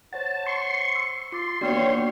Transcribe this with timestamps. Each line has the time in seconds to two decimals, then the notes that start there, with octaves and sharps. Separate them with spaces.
0.13 C5 C#5 F#5 A5
0.46 C6 C#6
0.96 E6
1.32 F4 C6 D6 A6
1.61 A#3 B3 D4 F#4 C#5 D5 G5